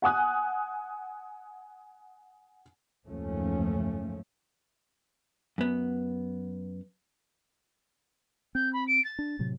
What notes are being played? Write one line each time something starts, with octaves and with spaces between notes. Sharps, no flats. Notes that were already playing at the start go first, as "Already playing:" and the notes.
F#5 G#5 D#6 F#6
F#1 D#2 G#2 F3 A3 C#4
F#2 B3
C4 G6
B5
D7
A6
D4
A2 C3 F#3